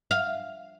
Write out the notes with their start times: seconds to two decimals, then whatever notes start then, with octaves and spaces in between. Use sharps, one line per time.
0.11 F5